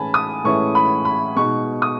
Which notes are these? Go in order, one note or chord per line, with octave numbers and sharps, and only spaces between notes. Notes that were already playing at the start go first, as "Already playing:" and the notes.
Already playing: A2 E3 G#3 C#4 E4 G#5 A5 B5
D#6
A2 E3 G#3 C#4 E4 C#6
B5
B5
B2 G#3 D#4 C#6
D#6